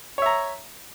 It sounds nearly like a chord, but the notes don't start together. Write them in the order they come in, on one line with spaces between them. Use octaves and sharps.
C#5 E5 A#5